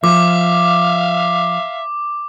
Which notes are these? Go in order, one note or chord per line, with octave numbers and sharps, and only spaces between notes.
F3 E5 F5 D6